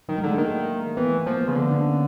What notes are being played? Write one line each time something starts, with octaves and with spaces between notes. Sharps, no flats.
D#3 F#3
G#3
D3 A3
D#3 A#3
E3 B3
A3
F3 A#3
B3
C#3
D3 B3
D4
C#4